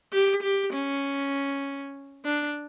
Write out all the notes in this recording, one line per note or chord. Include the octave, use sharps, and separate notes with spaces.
G4
G4
C#4
D4